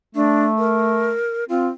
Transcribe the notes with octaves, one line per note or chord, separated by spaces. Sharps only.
A3 D4
A#4
C4 F4